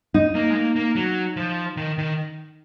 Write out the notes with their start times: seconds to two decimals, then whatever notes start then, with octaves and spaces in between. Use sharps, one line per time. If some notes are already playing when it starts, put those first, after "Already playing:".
0.14 D#4
0.35 A#3
0.50 G#3
0.55 A#3
0.76 A#3
0.95 F#3
1.36 F3
1.77 D#3
1.98 D#3